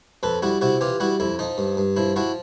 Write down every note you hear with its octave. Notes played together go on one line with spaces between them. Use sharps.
F2 A4 B4
G3 E4 F#4
C3 E4 F#4
E3 F4 G4
G3 E4 F#4
F2 E4
F3 D#4
G2
G2
F3 E4
F3 E4 F#4